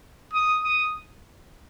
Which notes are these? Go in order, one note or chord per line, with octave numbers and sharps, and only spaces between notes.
D#6
D#6